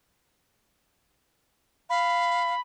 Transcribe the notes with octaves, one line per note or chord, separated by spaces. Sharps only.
F5 B5